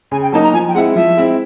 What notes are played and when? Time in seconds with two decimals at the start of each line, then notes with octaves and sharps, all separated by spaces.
0.12 C#3 G#5
0.22 G5
0.32 F#3 A#3 D#4 A5
0.43 A#5
0.53 F3 G#5
0.68 G5
0.74 G#3 C4 E4 F#5
0.96 F3 E5
1.17 G#3 C4 E4